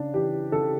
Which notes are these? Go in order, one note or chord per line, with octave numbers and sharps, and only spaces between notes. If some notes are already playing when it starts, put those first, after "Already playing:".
Already playing: C#3 D4
E3 G4
C#3 A4